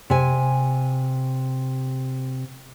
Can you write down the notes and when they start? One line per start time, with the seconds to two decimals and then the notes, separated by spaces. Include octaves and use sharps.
0.10 C3 G#5